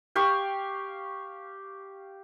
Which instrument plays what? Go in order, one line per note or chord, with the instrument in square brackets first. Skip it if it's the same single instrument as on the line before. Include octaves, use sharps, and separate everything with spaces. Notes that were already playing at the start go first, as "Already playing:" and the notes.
[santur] G4 F5 C#6